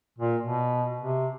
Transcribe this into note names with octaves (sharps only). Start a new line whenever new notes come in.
A#2
B2
C3